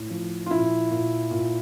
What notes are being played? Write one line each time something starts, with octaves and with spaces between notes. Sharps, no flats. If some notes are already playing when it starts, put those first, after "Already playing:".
Already playing: A2
F3
F4
A#2 E4
A#2
A#2